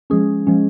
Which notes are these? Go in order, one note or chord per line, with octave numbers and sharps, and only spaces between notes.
F3 G#3 C#4 G#4
F3 G#3 C#4